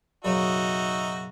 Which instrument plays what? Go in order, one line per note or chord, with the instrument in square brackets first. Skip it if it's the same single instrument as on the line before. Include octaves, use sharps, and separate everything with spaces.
[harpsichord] B1 F#2 C#3 [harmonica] D#4 F#4 E5